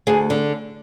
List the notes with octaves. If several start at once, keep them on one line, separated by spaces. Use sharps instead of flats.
D2 G#4
D3